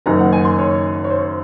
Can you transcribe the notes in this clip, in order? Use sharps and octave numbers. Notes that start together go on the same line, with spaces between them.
F#1 F#2 D#3 A#5
F#5
G#5
C6
C#5
C#5
C5